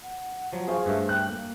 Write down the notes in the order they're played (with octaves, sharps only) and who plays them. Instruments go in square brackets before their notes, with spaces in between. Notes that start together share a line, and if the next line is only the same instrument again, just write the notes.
[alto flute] F#5
[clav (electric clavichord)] F3 F#3
[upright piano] G#4 C5 F5 [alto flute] C#6
[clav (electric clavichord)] G2 A3 [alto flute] E5
[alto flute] G5 [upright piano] F#6
[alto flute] A#3